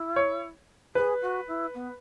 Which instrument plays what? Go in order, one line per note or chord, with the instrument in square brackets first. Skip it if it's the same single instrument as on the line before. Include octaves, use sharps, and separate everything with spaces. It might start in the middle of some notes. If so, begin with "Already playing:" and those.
Already playing: [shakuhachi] E4
[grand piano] C#5
[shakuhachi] G#4 [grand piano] B4
[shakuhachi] F#4
E4
B3